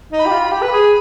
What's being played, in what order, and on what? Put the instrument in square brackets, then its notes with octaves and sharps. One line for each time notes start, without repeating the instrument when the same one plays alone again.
[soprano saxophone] D#4
[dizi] B5
[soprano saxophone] G4
F4
[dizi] B5
[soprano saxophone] G4
B4
G#4